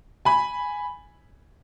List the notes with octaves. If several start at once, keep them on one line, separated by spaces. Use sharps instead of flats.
G#5 B5